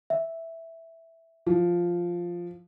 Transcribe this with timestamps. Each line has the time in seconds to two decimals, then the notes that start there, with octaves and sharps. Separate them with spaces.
0.10 E5
1.47 F3